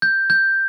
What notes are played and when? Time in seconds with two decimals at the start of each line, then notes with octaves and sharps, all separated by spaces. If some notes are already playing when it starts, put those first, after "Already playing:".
0.02 G6
0.30 G6